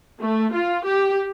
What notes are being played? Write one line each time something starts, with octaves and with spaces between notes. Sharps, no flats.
A3
F4
G4